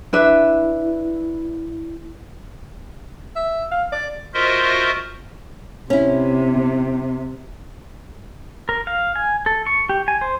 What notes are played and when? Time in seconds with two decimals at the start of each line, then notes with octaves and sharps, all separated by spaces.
0.13 D4 E4 B4 E5
3.36 E5
3.71 F5
3.92 D5
4.34 F4 F#4 A#4 C5 D#5 E5
5.90 C3 C#4 E4
8.69 A#4
8.87 F5
9.16 G#5
9.46 A4
9.66 C#6
9.89 G4
10.08 G#5
10.21 C5